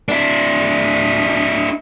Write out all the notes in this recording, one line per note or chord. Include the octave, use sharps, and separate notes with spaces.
D4 E4